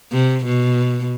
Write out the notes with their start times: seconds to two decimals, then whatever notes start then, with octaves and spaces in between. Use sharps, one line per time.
0.12 C3
0.45 B2